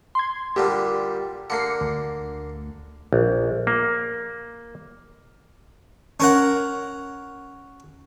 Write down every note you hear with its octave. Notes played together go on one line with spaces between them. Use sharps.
C6 G#6
A#2 D3 G3 G4
D3 A#3 C7 C#7
D2
A#1
A#3
C#4 A#4 F#5